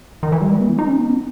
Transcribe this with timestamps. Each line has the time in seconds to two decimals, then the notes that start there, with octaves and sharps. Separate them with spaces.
0.23 D#3
0.32 E3
0.42 G3
0.51 G#3
0.60 B3
0.69 E4
0.79 D#4
0.87 C#4
0.97 B3
1.09 C#4